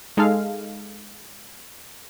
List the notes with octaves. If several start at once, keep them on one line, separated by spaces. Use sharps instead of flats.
G#3 D#4 A4 F5